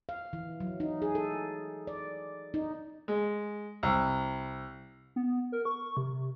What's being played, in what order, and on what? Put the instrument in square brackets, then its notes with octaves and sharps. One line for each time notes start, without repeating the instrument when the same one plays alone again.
[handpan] F5
E3
F#3
D#4
G#4
A4
D5
D#4
[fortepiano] G#3
C2
[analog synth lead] B3
A#4
C#6
C3